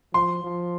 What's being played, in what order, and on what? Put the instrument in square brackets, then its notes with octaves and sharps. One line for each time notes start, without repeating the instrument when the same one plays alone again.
[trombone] F3 [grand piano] C6
[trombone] F3